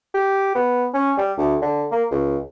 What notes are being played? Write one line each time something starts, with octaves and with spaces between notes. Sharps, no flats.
G4
B3
C#4
G3
D2
D3
A#3
C#2